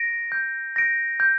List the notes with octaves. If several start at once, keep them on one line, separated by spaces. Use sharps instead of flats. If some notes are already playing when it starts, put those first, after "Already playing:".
Already playing: A#6 D7
G6
A#6 D7
G6